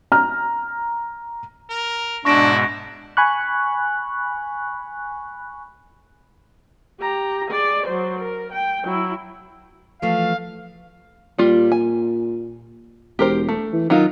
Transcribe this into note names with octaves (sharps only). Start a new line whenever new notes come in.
A#5 F6
A#4
G#2 B2 D4 E4 C#6 A#6 D7
G#5 B5 C#6 F#6
G4 A#5
G#4 D5
F#3 C5
A#4
G5
F#3 E4
E3 F3 A3 F5
A#2 G3 F4
G#5
E1 G4 A#4 C5
A3
E3
D#3 F#3 D#4 F4